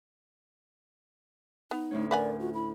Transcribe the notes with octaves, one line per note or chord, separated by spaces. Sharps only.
B3 D#4
D2 A2 A3 C#4
A#4 B4 D5 F#5 G#5
F4 F#4
E4 B5